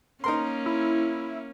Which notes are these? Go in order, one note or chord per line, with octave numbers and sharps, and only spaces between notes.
A#3 C#4 D#4 A#4 C6
E4